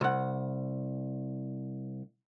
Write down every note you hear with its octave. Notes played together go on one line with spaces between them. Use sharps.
C2 F#5